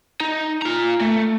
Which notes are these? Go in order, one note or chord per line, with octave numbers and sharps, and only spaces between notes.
D#4
F4 A#5
A3